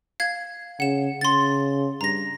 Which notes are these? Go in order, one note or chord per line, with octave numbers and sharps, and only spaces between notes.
F5 G#6
C#3 F#5 E7
C#3 C6 A6
G2 A#5 A#6